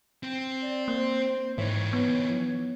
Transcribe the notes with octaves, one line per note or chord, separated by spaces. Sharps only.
C4
D5
A#3 C5
G#2 E3 D#4 C#5
B3